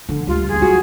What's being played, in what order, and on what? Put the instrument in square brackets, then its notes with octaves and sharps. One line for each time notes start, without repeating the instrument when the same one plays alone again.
[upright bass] D3
[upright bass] D2 G#3 [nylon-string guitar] G3 [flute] F4
[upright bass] D#2 [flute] G#4
[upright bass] E3 F#3 [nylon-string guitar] F4 F#4